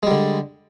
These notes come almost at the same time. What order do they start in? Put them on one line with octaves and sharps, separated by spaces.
G#3 G3 D3